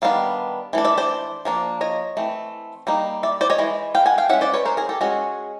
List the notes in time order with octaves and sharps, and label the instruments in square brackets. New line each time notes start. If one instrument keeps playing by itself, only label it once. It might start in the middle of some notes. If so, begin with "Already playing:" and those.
[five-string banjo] D#3 G3 B3 D4 F5
E3 A3 D4
D5 E5
C5 D5
F3 A#3 D4
C#5 D#5
E3 A3 C4
G3 A#3 D#4
D5 E5
C5 D5
C#5 D#5
E3 G#3
F5 G5
F#5 G#5
F5 G5
C#4 E5 F#5
G#3
C5 D5
B4 C#5
A#4 C5
G#4 A#4
G4 A4
G#3 C#4 F#4 G#4